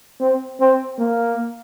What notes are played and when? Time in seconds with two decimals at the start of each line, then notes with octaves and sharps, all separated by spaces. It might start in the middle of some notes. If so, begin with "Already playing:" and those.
0.20 C4
0.60 C4
0.99 A#3